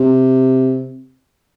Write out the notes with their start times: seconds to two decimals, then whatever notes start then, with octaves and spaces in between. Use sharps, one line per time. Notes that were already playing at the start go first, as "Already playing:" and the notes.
Already playing: C3